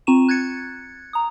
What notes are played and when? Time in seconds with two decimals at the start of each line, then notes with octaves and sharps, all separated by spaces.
0.07 C4 F4 A#5 C#6 D#7 E7
0.29 F#6 G#6 A6 C#7
1.13 A#5 D#6